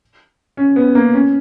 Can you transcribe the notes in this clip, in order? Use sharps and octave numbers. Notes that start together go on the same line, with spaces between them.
C#4
B3
A#3
C#4